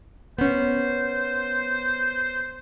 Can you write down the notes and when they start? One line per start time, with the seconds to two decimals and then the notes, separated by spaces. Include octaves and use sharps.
0.39 B3 C#4 C5